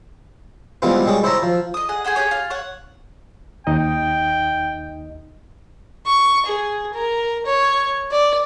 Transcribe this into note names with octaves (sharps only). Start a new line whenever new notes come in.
E3 G3 G#3 B3 C4 F4
G3 G#3 G4 G#4 C#5
E4 C5 C#5 E5 A5 A#5
F3
D#5 D#6
G#4 D#5 F#5
G#4 C5 F#5 G5
G4 G#4 C#5
F4
C#5 F#5
D#2 D#4 D#5 G5
C#6
G#4
A#4
C#5
D5